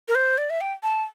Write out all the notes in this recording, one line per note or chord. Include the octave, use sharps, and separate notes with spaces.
A#4
C5
D5
E5
G5
A5